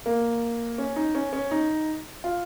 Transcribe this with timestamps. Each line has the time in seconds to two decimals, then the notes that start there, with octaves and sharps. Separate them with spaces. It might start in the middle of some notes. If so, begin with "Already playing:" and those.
0.06 A#3
0.78 C#4
0.96 D#4
1.15 C#4
1.33 C#4
1.51 D#4
2.24 F4